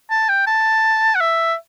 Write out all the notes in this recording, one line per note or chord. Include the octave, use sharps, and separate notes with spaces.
A5
G5
A5
F#5
E5